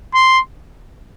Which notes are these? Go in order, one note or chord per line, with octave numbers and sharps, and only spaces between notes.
C6